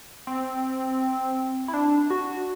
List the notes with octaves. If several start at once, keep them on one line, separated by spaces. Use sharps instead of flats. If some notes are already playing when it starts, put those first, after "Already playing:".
C4
E4
D4
F#4